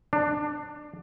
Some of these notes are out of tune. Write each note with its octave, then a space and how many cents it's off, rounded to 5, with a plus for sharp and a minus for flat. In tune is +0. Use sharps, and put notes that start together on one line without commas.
D4 +20